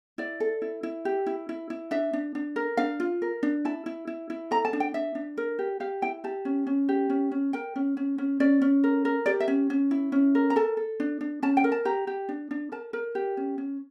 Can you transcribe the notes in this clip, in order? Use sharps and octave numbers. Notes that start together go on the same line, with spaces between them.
E4 D5
A4
E4
E4
G4
E4
E4
E4
D4 E5
D4
D4
A#4
D4 F5
F4
A#4
D4
E4 A5
E4
E4
E4
A4 A#5
A5
D4
G5
D4 E5
D4
A#4
G4
G4 F5
E4 G5
G4 A5
C#4
C#4
G4
C#4
C#4
A#4 G5
C#4
C#4
C#4
C#4 D5
C#4
A#4
A#4
G4 D5
E5
C#4
C#4
E4
C#4
A#4
A#5
A4 A5
A4
D4
D4
C#4 A5
G5
A#4
A5
G4 A#5
G4
D4
D4
A#4 A5
A#4
G4
C#4
C#4